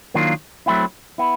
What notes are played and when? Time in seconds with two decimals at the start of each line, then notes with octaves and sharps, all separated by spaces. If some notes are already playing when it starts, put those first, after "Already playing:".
0.14 D#3 F#3 A#3 D4 F4
0.66 F#3 A3 C4 E4
1.18 B3 E4